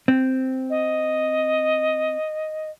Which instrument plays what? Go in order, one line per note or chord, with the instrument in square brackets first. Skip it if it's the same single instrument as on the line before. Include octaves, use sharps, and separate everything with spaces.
[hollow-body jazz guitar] C4
[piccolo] D#5